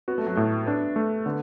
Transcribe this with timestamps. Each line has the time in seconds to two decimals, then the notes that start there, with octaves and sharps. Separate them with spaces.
0.08 B3 F#4
0.18 A3
0.26 F#3
0.36 A2 A3
0.66 B3 D4
0.96 A3
1.26 D3 B3